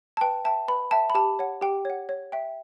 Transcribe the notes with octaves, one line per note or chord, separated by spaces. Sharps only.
A5
B4 G5
E5 G5 A5
B4 B5
E5 G5 A5
B5
G4 A5
C#5 F#5
G4 G5
C#5 F#5
C#5
E5 G5